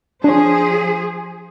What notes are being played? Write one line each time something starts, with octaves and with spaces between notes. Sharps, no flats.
F3 D4 G#4 C5 C#5